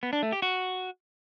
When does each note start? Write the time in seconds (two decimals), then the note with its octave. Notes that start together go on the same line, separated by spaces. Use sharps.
0.03 B3
0.13 D4
0.23 A3
0.32 G4
0.42 F#4